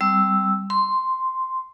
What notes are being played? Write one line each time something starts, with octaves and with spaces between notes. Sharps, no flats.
G3 C4 E6
C6